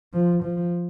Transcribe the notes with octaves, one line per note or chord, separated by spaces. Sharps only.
F3
F3